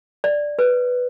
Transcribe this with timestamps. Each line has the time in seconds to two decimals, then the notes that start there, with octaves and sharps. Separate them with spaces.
0.24 D5
0.59 B4